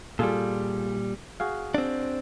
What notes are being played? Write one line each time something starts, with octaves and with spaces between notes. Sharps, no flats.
A#2 G3 F4 G#4 A4
F#4 G#4 F5
C4 D4